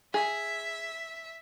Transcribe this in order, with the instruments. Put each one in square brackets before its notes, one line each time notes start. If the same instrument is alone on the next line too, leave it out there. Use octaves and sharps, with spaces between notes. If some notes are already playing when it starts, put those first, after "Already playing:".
[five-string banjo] G#4 [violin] E5